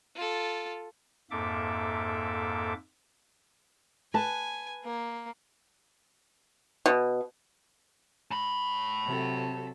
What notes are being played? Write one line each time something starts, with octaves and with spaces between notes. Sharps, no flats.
F4 A4
F2 G#2 A#3 A4 E5 D6
B4 G#5 A5
A#3
B2
A5 B5
C3 F#3 A4